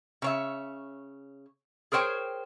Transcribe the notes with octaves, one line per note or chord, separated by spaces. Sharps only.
C#3 C#5 E5
G#4 A#4 C5 C#5 G5